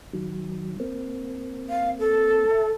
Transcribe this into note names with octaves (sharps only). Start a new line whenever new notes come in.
D#3 F#3
A#3 C4
F5
A4
E5